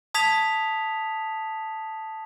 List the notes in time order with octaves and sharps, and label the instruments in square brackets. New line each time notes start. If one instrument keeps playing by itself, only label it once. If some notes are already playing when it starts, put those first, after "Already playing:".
[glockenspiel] A5 D#6 G#6 B6 F7